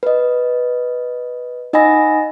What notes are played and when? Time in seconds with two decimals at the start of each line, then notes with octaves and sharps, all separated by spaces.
0.03 B4 D#5
1.73 D#4 D#5 F#5 G#5 B5 A#6